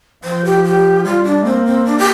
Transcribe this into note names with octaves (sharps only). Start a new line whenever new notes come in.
F3 C5
G4
G4
G3 F4
D4
A#3 C4
C4
D4
G4